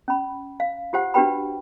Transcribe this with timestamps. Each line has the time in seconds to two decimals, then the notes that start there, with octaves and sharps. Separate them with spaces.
0.08 C#4 B5
0.60 F5
0.93 F4 G4 C5 F#5
1.14 D4 F#4 G4 B4 G5 B5